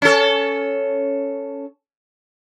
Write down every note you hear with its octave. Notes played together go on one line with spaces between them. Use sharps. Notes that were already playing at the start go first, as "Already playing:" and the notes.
C#4 A4